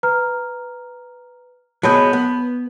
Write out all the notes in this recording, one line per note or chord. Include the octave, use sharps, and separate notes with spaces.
B4 A#5 F6
F#3 G#3 B3 A5 B5 G6
B3